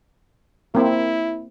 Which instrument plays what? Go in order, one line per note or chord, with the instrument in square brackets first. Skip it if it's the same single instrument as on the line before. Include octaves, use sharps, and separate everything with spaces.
[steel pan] A#3 C4 [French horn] E4